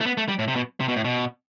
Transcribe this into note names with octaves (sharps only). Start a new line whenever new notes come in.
A3
B3
A3
G3
A2
C3
B2
C3
B2
A2
B2